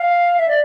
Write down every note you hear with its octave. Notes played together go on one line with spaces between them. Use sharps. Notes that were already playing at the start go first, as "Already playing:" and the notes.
Already playing: F5
E5
D5